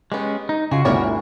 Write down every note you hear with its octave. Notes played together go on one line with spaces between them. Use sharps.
G#3 B3 C#4 G4
D#4
C#3 F4 F#4 G#4
G1 D2 E4 A#4 C#5 D5